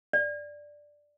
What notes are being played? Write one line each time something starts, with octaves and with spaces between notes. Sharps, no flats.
D5